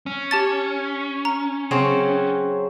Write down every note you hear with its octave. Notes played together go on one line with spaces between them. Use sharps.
C#4
G4 A5 A6
A#5
C#3 F#3 C4